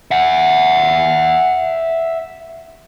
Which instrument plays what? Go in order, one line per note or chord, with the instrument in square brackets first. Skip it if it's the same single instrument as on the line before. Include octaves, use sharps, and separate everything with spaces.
[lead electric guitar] E5 F#5